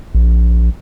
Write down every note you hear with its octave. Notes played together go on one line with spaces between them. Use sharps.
A#1